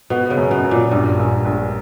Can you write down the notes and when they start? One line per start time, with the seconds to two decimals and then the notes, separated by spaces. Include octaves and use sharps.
0.10 B2 B3
0.30 C#3
0.37 F#2
0.51 B2
0.65 F#2
0.71 A#2
0.92 A#1 G2
1.19 A#1
1.45 A#1